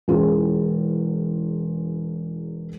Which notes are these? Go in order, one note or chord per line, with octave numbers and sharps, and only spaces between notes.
E1 E2 C#4 F4 G#4